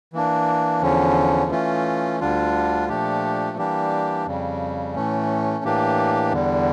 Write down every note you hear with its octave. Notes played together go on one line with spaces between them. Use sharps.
E3 A#3 D4
E2 D3 F3 C#4
E3 A3 C#4 F4
D2 D3 G3 D4 F4
A#2 F3 A3 D4 G4
E3 G3 A#3 D4 G4
F2 C#3 G3
A2 E3 A3 C#4
A2 E3 A#3 D4 G4
E2 D3 G3